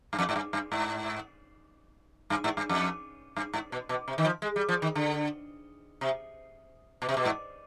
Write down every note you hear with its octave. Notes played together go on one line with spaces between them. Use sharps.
G2
F2
G#2
G2
G2
G#2
G2
G#2
G2
F2
G2
G#2
B2
B2
C3
D#3
F3
G#3
G3
F3
D#3
D3
C3
B2
C3
B2
G#2